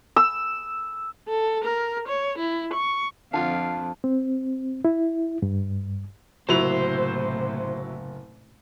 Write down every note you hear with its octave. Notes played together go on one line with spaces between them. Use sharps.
E6
A4
A#4
C#5
E4
C#6
F2 D3 F4 F5 A5
C4
E4
G2
F#1 A2 C3 F#3 A#3 E4 C5 F7